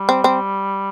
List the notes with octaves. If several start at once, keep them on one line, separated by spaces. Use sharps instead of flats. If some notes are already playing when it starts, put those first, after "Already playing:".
Already playing: G3
C4
C4